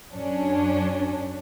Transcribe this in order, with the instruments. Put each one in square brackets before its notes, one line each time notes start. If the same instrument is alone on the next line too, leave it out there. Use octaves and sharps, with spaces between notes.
[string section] F#2 C#4 D4